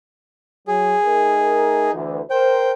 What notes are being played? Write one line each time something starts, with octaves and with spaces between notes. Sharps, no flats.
F#3 G#4
A3 D#4 A#4
D2 E3
A#4 C5 G5